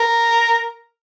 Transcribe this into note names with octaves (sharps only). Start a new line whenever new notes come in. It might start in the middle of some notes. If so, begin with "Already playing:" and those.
Already playing: A#4